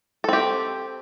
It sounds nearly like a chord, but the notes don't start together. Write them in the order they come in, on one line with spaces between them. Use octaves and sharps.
A4 C4 G4